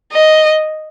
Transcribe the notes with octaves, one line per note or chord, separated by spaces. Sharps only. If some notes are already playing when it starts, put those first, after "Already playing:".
D#5